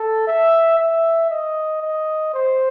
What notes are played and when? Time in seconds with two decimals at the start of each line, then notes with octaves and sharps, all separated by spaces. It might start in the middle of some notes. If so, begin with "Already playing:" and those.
Already playing: A4
0.27 E5
0.79 E5
1.30 D#5
1.82 D#5
2.34 C5